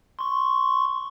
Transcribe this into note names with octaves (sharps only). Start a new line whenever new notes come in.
C6 C#6